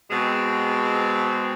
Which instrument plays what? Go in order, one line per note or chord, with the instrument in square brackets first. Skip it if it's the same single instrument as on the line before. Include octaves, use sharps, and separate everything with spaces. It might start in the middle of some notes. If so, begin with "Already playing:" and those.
[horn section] B2 G#3 C4